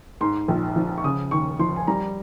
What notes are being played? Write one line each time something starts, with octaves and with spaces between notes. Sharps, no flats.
G#2 C6
A#1
F3
C#6
C#3 D#6
D#2 C#6
F3 C6
G#5
G3 A#5